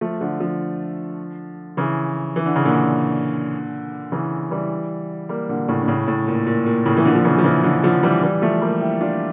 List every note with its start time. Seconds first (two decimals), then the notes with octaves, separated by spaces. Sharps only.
0.01 F3 A3
0.21 D3 F3
0.40 D3 F3
1.77 C#3 E3
2.36 E3
2.46 D3
2.56 C#3
2.65 A#2 D3
4.12 C#3 E3
4.51 E3 G3
5.29 G3 A#3
5.49 A#2 D3
5.68 A2 C#3
5.82 D3
5.88 A2 C#3
6.08 A2
6.28 A#2
6.46 A#2
6.66 A#2
6.86 A2 C#3
6.97 E3
7.05 A#2 D3
7.15 F3
7.25 C#3 E3
7.38 F3
7.44 C#3 E3
7.63 D3 F3
7.83 D3 F3
8.03 E3 G3
8.23 E3 G3
8.42 F3 A3
8.62 G3 A#3
8.81 E4 G4
9.01 D4 F4